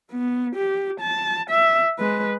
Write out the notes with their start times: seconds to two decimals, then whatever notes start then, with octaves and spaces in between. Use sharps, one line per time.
0.11 B3
0.55 G4
1.00 A5
1.50 E5
1.99 G#3 B4